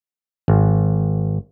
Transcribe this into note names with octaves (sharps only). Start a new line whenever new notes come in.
G#1